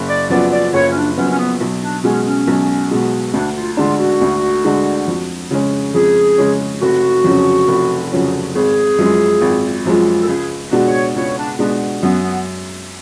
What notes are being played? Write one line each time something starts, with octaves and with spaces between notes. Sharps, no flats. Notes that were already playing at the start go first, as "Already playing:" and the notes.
Already playing: F#1
D5
F#2 F3 B3 D5
D5
F#1 C#5
C#4
D4
F#2 F3 B3 C#4
C#4
B3
B1
D4
B2 G#3 C#4
C#4
B1
B2 G#3
D2 D4
F4
D3 G#3 D4 F4
F#4
D2
D3 G#3 D4
F2
C#3 G#3 C#4
F2 G#4
C#3 G#3 C#4
F1 F#4
F2 C#3 F#3 C#4
F1
F2 C#3 F#3 C#4
G#1 G#4
F#2 F3 G#3
G#1
F#2 F3 G#3
A4
C#2 G#4
B2 G#3 D4 F#4
C#5
C#2 C#5
D4
B2 G#3 B3 D4 F#4
F#2 B3
B3